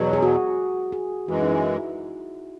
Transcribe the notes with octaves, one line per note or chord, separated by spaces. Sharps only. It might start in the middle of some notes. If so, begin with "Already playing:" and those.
Already playing: E2 B2 F#3
G#4
F#4
G#4
F#2 E3 G#3 F#4
D#4
E4